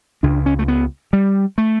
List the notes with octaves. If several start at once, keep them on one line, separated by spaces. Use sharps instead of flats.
C#2 C#3 D4
C#4
A3
B3
G3
A3